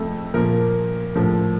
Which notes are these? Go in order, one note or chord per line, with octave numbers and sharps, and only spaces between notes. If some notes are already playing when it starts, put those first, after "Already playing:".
Already playing: F2 C3 F3 A3 A4
A#2 F3 A#3 A#4
A2 F3